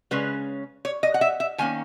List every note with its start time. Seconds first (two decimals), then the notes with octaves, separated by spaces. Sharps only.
0.11 C#3 G#3 C#4 B4
0.85 C#5
1.03 D#5
1.14 F#5
1.21 E5
1.40 E5
1.58 D#3 A#3 C#4 G#5